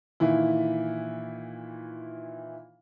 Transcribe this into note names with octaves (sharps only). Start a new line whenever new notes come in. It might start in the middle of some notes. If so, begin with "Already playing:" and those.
A#2 D#3 E3 E4